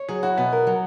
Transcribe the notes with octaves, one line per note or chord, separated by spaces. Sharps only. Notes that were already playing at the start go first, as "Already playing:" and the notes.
Already playing: C#5
F#3 G#4
E4 F#4
B2 B3
A#4
F#3